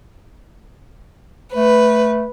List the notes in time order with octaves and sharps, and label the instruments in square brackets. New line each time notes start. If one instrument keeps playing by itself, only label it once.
[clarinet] A3 [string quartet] B4